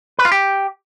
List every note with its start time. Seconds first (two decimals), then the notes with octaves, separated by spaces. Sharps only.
0.19 B4
0.25 F4
0.32 G4